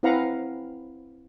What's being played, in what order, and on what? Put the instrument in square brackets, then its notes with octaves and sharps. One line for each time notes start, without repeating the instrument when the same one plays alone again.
[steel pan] C4 E4 B4 F5 F#5 A#5